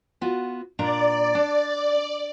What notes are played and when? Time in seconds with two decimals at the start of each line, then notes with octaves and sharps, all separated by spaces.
0.21 B3 F4 F#4
0.79 A#2 D4 D5 A#5
1.35 D4